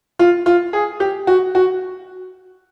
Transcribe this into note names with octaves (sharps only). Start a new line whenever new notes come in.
F4
F4
G#4
G4
F#4
F#4